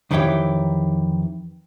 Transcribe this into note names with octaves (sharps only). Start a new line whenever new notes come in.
F2 D#3 E3 E4 G4 C#5